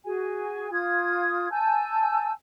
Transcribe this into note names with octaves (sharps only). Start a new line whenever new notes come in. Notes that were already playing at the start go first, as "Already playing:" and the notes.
F#4 G#4 G#5
F4 D#6 G#6
G#5 A5 E6 G6